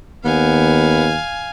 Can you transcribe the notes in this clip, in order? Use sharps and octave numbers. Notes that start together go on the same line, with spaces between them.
D#2 B3 F5 G#5